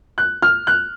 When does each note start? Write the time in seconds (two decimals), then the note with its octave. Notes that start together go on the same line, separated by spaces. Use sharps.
0.18 F#6
0.42 F6
0.67 F#6